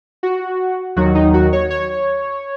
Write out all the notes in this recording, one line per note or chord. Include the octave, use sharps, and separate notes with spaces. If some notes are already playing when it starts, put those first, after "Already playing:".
F#4
D#2 D#3 F#3 F#4
D#4
F#4
C#5
C#5